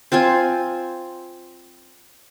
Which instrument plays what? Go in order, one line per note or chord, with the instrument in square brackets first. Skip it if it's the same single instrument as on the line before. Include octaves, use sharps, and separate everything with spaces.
[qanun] C4 F4 C5 G#5